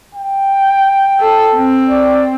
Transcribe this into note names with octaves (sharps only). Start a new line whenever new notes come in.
G5
A4
C4
D5